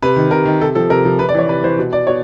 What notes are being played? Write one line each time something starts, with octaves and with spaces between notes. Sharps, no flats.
C3 B4
D#3
C3 A#4
D#3
C3 A4
F3 A4
C3 A#4
F3
C3 B4
D5
E3 C#5
C3 B4
E3 C5
B2
D5
B2 C#5